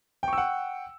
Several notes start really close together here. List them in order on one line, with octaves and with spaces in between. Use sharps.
G5 C#6 E6 F#5